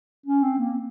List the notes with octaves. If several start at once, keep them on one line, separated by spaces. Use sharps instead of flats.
C#4
C4
A#3